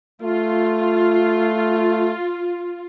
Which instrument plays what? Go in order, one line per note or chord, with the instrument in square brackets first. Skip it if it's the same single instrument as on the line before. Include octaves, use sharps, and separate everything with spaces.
[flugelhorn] A3 [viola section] F4